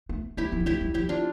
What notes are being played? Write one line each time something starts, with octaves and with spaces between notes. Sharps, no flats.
A3
A3 E4 G4
F3
A#3
A3 E4 G4
G3
F3 E4 G4
D4 F4